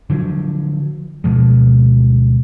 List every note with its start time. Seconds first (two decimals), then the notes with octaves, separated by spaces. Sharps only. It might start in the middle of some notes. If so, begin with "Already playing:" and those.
0.10 D3 F3 F#3
1.24 D2 B2 F3 G#3